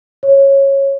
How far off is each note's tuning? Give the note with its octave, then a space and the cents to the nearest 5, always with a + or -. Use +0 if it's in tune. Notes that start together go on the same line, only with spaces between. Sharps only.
C#5 -15